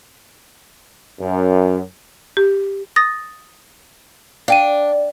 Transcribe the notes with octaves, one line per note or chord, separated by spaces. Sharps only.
F#2
G4
D#6 A6 A#6
D4 F5 G5 D#7